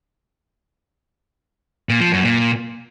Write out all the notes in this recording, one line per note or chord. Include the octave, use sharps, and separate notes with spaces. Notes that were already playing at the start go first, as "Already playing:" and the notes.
A#2
F3
F#2
A#2